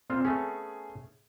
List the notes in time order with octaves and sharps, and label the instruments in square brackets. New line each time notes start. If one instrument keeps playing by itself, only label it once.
[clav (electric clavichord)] A#2 F4 [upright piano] C4
[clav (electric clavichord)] A3 B3 C#4 [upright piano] G#4